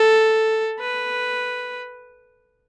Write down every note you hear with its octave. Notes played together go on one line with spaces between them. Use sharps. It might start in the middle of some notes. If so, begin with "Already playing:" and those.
Already playing: A4
B4